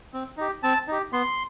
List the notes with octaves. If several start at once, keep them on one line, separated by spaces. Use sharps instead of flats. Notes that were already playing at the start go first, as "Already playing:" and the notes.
C4
D#4 G4
C4 A5
D#4 G4
B3 C6